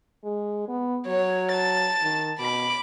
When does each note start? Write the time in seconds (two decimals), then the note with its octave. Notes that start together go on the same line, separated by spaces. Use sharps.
0.24 G#3
0.68 B3
1.07 F#3 C#5
1.52 A5 A6
2.03 D#3
2.39 B2 B5 D6